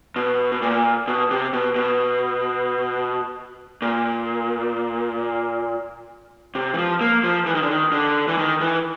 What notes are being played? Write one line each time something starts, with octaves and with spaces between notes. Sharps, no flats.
B2
B2
A#2
B2
C3
B2
B2
A#2
C3
E3
F3
A#3
F3
E3
D#3
D3
D#3
D3
E3
D#3
E3